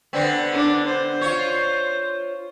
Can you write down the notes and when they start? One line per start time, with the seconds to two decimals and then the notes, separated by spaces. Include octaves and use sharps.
0.13 D3 B3 C4
0.53 D4
0.87 C5
1.21 F4 C#5